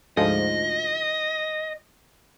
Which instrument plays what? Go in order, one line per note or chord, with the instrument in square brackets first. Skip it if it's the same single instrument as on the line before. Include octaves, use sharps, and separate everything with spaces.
[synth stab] D2 G#2 F3 [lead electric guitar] D#5